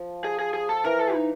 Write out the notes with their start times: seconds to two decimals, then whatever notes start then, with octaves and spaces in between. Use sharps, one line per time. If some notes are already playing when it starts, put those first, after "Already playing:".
Already playing: F3
0.24 G#4
0.39 G#4
0.54 G#4
0.69 A4
0.84 E3 A#4
0.99 A4
1.14 D#4